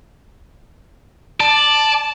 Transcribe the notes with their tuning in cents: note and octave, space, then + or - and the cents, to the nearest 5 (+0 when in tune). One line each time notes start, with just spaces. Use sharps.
D5 +10 A5 -5